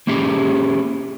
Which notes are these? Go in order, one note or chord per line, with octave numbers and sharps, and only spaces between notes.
A#3 C#4 E4 G4 G#4